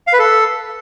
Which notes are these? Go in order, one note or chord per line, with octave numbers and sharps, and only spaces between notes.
F5
B4
A4